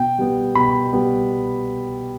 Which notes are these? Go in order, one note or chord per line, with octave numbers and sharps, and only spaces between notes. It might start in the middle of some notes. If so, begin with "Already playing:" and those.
Already playing: B2 G5
G3 B3
B2 B5
G3 B3